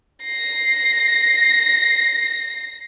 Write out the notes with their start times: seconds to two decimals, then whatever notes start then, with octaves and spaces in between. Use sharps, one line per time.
0.24 A#6 C7